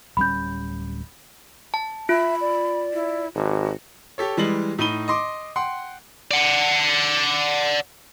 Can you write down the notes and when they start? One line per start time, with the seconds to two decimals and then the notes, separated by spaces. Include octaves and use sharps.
0.17 D1 G3 C#4 B5 G6
1.74 A5
2.09 F4 E5 B5
2.41 D5
2.93 E4
3.35 G#1 F#4
4.18 G4 A4 C#5
4.37 E3 G3 G#3 F#7
4.79 A2 D#4 B5 D#7 G7
5.08 D#5 C6 D6
5.56 F#5 G5 C6
6.31 D5 F#5